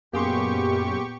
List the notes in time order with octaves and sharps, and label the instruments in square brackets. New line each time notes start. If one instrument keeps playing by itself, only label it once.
[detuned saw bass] F#2 [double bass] A#2 B3 [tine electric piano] A#3 G#4 C6 [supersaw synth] G4 C#6